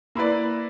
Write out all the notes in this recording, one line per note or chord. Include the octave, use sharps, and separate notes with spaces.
A#3 E4 B4 D5